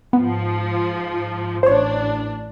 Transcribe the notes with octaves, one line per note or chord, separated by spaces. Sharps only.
G#2 F3 B3
A1 D4 C5 C#5